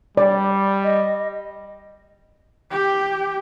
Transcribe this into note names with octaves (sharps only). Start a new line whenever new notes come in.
G3 D5
D#5
G4 G5